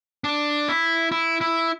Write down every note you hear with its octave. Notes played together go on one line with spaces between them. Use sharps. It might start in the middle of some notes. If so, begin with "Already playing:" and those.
D4
E4
E4
E4